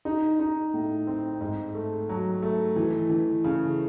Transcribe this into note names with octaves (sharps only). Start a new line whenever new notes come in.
D#4
D#4
A2
C4
G#2
A3
F#3
A3
E3
E3
C#3